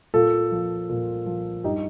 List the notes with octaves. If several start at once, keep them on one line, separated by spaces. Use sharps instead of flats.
A#2 F4 A4
F3
A#2
F3
G2 D#4 G4